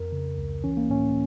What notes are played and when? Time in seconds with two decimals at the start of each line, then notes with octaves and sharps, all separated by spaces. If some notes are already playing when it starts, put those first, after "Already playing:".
Already playing: F2 A#4
0.12 C#3
0.37 C#2
0.64 E3 C#4
0.77 A#3
0.90 A2 C#4